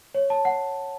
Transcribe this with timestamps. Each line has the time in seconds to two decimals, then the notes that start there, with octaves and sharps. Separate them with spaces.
0.15 C#5
0.30 A5
0.45 F#5